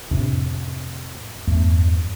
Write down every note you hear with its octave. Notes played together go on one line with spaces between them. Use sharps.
F2 A2 C3 D4
E2 G2 A3